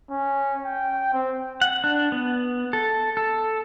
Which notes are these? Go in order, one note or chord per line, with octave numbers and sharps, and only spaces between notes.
C#4
G5
C4
F#5
D4
B3
A4
A4